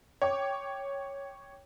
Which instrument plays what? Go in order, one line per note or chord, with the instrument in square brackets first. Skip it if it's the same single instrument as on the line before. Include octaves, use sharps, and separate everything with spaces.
[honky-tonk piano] C#5 G5 D6